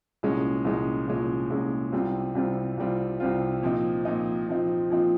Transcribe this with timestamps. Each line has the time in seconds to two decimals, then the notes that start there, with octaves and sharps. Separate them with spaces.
0.23 C2 A#2 G#3 C#4
0.65 C2 A#2 G#3 C#4
1.08 C2 A#2 G#3 C#4
1.50 C2 A#2 G#3 C#4
1.93 C2 C3 G3 C4 F4
2.35 C2 C3 G3 C4 F4
2.78 C2 C3 G3 C4 F4
3.20 C2 C3 G3 C4 F4
3.63 A#2 F3 C4 D#4
4.05 A#2 F3 C4 D#4
4.47 A#2 F3 C4 D#4
4.90 A#2 F3 C4 D#4